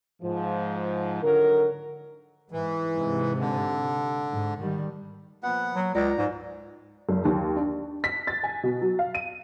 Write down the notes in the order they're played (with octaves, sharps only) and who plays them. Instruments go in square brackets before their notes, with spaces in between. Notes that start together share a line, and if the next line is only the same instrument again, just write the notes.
[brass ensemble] G#2 F3
D3 D#3 F#3 A#4
[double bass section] G#2 [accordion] E3
[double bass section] G#2 C3
[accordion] D3
[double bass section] G#2
D#3 G3
[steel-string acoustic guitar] A#2 F3 [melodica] B3 F#5
[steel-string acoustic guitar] A#2 [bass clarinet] F#3
[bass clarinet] C#2 [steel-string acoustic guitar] D5 [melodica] A#5
[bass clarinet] G#2 [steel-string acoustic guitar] F#3
[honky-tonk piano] F#1
D#2
D4
B6
A6
G#5
B2
F#3
F5
D#7